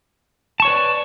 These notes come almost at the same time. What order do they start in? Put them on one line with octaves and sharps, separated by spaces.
A5 C#6 C#5 B4 D5